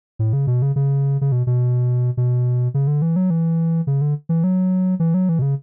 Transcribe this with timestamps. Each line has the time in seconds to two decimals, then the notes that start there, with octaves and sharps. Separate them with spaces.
0.19 A2
0.33 C#3
0.47 B2
0.62 C#3
0.76 C#3
1.21 C#3
1.32 B2
1.47 B2
2.17 B2
2.74 C#3
2.87 D3
3.02 E3
3.16 F#3
3.30 E3
3.87 C#3
4.01 D3
4.29 E3
4.44 F#3
5.00 E3
5.14 F#3
5.29 E3
5.39 B2
5.42 C#3